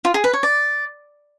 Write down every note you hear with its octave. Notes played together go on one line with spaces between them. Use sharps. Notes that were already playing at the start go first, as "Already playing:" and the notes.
F4
G#4
B4
C#5
D5